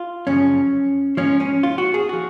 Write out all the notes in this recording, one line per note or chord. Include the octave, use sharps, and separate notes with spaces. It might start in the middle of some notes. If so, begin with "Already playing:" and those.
Already playing: F4
F#2 C#3 F3 C#4
G#2 F3 C#4
C#4
F4
F#4
G#4
F3 F#4